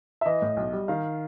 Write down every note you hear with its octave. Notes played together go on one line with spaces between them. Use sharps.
E5
E3 D#5
A2
B1
G3
D#3 F5